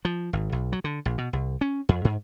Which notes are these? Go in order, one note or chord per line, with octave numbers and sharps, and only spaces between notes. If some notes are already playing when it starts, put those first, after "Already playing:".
F3
G#1
B1
F#3
D3
A#1
B2
C2
C#4
F2
G#2